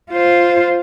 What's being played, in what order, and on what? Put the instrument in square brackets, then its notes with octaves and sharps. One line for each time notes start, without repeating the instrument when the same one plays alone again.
[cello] F4 C5